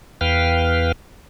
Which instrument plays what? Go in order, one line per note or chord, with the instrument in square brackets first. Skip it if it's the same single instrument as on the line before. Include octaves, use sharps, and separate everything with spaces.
[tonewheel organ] E2 B4 F5 G5 F6